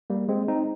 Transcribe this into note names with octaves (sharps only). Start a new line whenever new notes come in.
G3 A#3
G#3 C4
C4 D#4